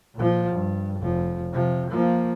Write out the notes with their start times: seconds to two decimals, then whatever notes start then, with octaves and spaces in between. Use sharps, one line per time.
0.15 A#2 F3
0.52 G2
1.00 F1 F3
1.53 C3 F3
1.90 F3 A#3